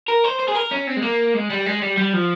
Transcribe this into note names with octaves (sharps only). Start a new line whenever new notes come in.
A#4
C5
C5
G#4
A#4
C#4
C4
G#3
A#3
G#3
G3
G#3
G3
G3
F3